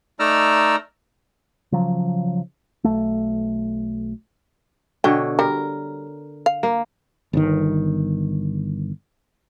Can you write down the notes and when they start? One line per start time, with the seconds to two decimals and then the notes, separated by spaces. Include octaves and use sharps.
0.20 A3 D#4 D5 A#5 E6 F6
1.72 C#3 F3 F#3
2.84 B1 A3
5.04 B2 D3 C#5 G5
5.39 G3 A#4
6.46 F5
6.63 A#3
7.33 G1 D#3